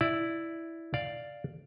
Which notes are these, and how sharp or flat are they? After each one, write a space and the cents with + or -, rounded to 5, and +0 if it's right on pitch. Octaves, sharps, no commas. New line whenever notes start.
E4 +0 D5 +0
D5 +0 F5 +0